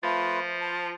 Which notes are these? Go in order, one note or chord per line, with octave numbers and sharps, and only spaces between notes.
F3 A3 F4 B4
A5